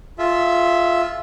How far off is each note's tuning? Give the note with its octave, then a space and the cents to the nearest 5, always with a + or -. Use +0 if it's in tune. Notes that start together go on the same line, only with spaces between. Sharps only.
F4 +0 G#4 +40 E5 +0